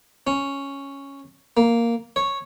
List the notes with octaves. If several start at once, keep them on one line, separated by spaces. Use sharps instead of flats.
C#4
A#3
C#5